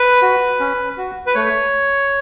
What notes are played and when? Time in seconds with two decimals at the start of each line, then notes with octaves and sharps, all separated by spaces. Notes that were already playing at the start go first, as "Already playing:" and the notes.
Already playing: B4
0.22 F#4
0.60 C#4
0.98 F#4
1.26 B4
1.35 A3 C#5